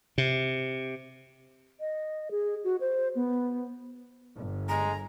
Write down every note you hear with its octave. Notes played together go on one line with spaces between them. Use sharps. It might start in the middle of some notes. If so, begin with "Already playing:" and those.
C3
D#5
G#4
F#4
C5
B3
G1
G#3 A#5